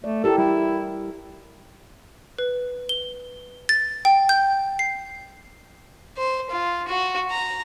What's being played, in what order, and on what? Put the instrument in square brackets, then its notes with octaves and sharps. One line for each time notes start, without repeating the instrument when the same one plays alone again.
[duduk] A3 [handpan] D5
[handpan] E4 G4 A#4 [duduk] A4
[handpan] G3 [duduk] E4
[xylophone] B4
G7
A6
G5
G6
C7
[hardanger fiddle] C5
F4
F#4
A#5